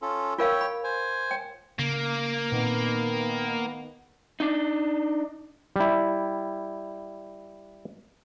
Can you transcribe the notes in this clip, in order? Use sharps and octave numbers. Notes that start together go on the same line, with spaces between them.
C#4 F4 A4
F4 A#4 C#5 F5 G5
B5
C5 G#5
G5
C#3 A#3
A#2 D#3 B3 C4
D4 D#4
G3 E4